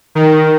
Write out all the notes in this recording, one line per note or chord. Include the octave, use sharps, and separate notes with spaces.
D#3